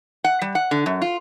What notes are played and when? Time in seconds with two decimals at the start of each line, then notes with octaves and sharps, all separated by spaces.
0.24 F#5
0.42 G3
0.55 F#5
0.71 D3
0.86 F#2
1.02 F4